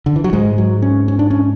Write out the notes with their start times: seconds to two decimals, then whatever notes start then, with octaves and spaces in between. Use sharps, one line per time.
0.06 D3
0.16 E3
0.24 F#3
0.33 G#2 G#3
0.58 F#3
0.82 C#4
1.08 C#4
1.19 D4
1.30 C#4